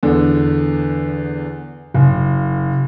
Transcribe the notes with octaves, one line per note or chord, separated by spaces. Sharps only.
E2 D3
F#1